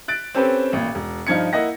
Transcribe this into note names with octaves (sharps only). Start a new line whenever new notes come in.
F#6 A6 D7
C4 C#4 G4 A4 B4 C5
A1 A#2
E1
G2 F3 D#4 G#6 C#7
A#3 E4 D#5 F#5 A#6